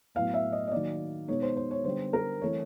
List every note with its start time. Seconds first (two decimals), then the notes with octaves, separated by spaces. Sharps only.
0.15 A2 F#3 B3 E4 F5
0.34 E5
0.52 D#5
0.68 D#5
0.71 D#3 F#3 A#3 D5
1.28 B2 G#3 B3 D#4 C#5
1.42 C5
1.57 C5
1.71 C#5
1.84 D3 G3 B3 C5
2.13 A#4
2.41 E3 A3 C4 E4 C#5